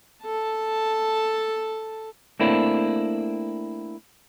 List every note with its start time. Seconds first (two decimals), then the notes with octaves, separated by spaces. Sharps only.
0.23 A4 A5
2.40 A3 A#3 C4 D4 E4